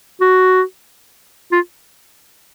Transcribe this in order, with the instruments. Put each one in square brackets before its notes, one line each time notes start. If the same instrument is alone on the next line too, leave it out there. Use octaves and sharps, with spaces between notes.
[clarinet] F#4
F4